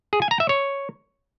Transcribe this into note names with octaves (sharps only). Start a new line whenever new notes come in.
G#4
G#5
A#5
E5
C#5